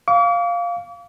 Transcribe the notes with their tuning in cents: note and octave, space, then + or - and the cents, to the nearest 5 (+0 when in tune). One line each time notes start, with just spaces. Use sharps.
F5 +0 D6 -45